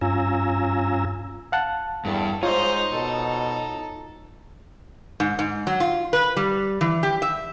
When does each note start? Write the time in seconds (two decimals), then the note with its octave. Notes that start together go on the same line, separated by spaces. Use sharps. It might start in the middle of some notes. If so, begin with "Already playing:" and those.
0.01 G2 C#4 F4 G#5 A#5 E6
1.52 F5 F#5 A5
2.05 E2 G2 A4
2.43 G#2 D#4 F4 C5 C#5
2.92 B2 A4
5.20 G#2
5.39 G#2
5.67 F#3
5.80 F4
6.13 B4
6.37 G3
6.81 E3
7.03 G4
7.22 E5